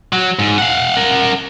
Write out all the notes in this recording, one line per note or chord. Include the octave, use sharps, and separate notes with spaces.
F#3
G#2
F5 F#5
A#4 F#5